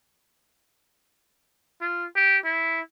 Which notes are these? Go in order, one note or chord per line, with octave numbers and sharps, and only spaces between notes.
F4
G4
E4